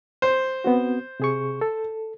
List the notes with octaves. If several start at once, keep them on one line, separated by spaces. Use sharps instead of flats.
C5
B3 C4 F#4
C3 G#4 C#6
A4